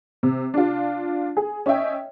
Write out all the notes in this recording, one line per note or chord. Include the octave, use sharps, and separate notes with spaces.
C3
D4 F4
G#4
C#4 C#5 D#5 E5 G5